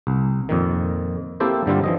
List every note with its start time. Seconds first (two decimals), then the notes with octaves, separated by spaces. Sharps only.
0.07 C2
0.49 F2 A#2 D#3
1.40 A#3 C4 E4 G4 A4 C5
1.66 G2 D3 G3 F4
1.84 E3 F3 D#5